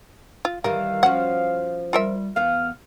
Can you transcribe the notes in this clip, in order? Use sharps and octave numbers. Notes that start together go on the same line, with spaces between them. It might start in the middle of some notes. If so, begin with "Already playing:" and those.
F4
D#3 E3 G3 A#4 F5
F3 C#4 F#4 F#5
G3 F4 A#4 E5
E2 B3 F5 F6